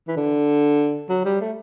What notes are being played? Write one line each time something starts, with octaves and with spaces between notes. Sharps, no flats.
E3
D3
F#3
G3
A3